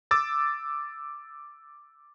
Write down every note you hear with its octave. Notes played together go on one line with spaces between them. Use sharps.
D6 E6 A6